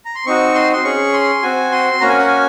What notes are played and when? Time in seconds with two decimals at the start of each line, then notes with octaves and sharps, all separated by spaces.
0.05 A#5
0.15 C6
0.26 C4 D#4 F#4 C#6
0.55 C6
0.73 C6
0.84 C#4 G#4 C#6
1.13 C6
1.42 C4 F#4 G#5
1.72 C6
2.01 A#3 C#4 F#4 A#5
2.09 G#5
2.18 F#5
2.27 G#5